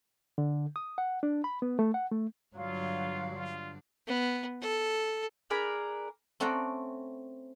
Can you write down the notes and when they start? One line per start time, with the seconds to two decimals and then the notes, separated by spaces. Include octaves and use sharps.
0.38 D3
0.76 D#6
0.98 F#5
1.23 D4
1.44 B5
1.62 B3
1.79 A3
1.94 F#5
2.12 A3
2.56 G2 D3 F#3 D4 F4 F5
3.33 F4
4.07 B3
4.62 A4
5.50 D4 G#4 A#4 B5
6.40 A3 C4 C#4 D5 F#5 A#5